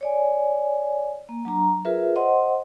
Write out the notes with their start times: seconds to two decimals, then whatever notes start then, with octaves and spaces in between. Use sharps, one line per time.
0.01 C#5 D5 G#5
1.29 A#3
1.45 F#3 D4 A#5
1.85 F4 G#4 A#4 B4 E5
2.16 C5 D#5 F#5 C6